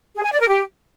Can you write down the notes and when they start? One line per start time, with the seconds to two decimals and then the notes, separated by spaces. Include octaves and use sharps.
0.15 G#4
0.24 G#5
0.32 D5
0.40 A#4
0.49 G4